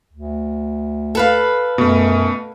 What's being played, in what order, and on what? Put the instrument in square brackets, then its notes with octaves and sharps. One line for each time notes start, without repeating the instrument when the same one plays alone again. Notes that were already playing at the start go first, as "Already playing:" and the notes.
[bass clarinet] D2
[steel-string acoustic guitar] A4 B4 F5
[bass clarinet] F#2 [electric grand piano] B2 A3